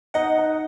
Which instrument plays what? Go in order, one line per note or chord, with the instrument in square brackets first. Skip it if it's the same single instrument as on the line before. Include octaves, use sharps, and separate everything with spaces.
[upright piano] D#4 [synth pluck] D#5 F#5
[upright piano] D#4